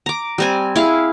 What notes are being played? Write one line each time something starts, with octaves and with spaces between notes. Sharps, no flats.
A#5 D6
G3 C4 G#5
E4 G#4 F5